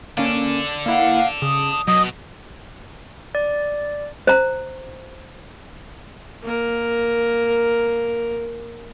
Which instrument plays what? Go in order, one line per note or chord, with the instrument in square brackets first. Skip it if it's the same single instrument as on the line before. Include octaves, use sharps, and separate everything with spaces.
[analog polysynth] A#3 C#4 [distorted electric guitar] A4 D5
[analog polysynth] A#3 E4 [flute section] F5 F#5
[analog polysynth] C#3 [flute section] D#6
[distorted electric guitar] B2 [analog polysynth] F#3 [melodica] D#5
[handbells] D5
[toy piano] C5 A#5
[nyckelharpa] A#3 A#4